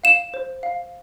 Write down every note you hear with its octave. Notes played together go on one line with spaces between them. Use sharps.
F5 E7
C5
F5